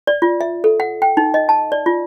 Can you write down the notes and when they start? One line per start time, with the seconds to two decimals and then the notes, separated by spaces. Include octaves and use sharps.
0.07 D5
0.22 F4
0.41 E5
0.64 A4
0.80 F#5
1.02 G5
1.17 D#4
1.34 D#5
1.49 A5
1.72 D5
1.86 F4